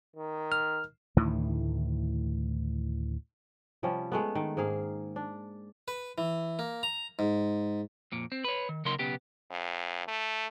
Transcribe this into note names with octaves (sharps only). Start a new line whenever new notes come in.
D#3
F6
D2 A2 D#3 E3
C3 F3 G3 C#4
G#3 A3 B3
D#3
G#2 A#3 G#4 F5
D4
B4
E3
A#3
A#5
G#2
F2 A#2
C4
B4 C#5
D#3
C#3 F#3 A#3 D#4 A#4 C6
B1 C#3 B3 G4
F2
A3